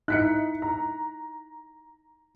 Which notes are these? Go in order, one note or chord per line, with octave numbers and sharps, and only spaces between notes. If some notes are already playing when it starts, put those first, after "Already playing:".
D#4 E4 F#6 B6 C#7
A#5